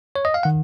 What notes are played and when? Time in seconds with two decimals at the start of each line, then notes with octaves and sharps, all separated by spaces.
0.16 C#5
0.25 D#5
0.34 F5
0.43 D#3 F#5